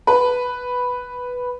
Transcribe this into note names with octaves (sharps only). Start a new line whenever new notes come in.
B4